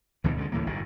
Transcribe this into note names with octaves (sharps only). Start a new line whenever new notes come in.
D2 G2 B2 E3
D3 G3 G#3
D2 A2 E3 A#3
F#1 G#2 D#3